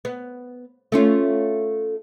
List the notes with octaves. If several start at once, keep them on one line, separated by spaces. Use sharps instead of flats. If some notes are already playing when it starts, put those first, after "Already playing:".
B3
A3 C#4 F4